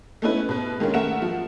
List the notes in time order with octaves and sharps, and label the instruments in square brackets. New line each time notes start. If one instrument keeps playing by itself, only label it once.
[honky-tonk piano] A3 B3 C#4 D#4 E4 B4
B2 B4
G#2 D#3 G#3 A#3 C#4
A3 A#4 E5 F#5 E7
F3